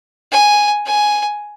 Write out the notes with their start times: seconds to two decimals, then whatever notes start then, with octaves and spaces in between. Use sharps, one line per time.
0.32 G#5
0.86 G#5